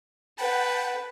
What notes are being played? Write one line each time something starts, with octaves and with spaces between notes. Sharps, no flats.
B4 F#5 G5 A5